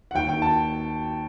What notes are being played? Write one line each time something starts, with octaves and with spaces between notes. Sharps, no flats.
F#5
D#2 G5
G5
D#3
A5